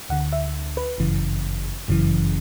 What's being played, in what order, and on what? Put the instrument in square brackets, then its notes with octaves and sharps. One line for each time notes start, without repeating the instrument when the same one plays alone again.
[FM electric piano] D2 D3 F#5
E5
B4
G1 F#2 C#3 E3
G1 F#2 C#3 E3